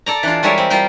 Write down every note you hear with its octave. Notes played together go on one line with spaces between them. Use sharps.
A4 D5 A#5
E3 D4 F4
G3 G#3 A#4 C#5 E5
C4
G3 F4 A#4 G5